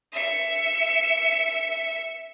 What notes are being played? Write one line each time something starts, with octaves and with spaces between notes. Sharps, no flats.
E5 C#7